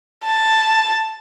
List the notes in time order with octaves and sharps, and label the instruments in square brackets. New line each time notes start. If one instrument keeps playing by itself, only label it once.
[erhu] A5